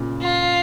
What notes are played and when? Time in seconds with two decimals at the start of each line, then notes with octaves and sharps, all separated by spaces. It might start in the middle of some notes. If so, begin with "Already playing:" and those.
Already playing: A#2 C#3
0.21 F4